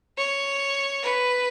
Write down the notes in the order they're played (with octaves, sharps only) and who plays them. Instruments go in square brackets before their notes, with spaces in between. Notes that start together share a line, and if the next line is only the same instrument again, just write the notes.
[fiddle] C#5
B4